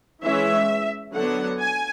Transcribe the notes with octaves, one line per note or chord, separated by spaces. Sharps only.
E3 G#3 C#4 E5
D3 F#3 B3 D4 F#5
G#5